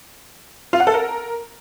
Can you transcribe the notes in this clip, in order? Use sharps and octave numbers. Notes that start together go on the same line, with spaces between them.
F4
F#5
A4
A#4